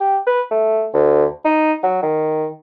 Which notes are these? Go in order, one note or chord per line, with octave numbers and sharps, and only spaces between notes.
G4
B4
A3
D2
D#4
F#3
D#3